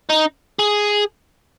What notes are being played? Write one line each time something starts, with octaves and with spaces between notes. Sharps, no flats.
D#4
G#4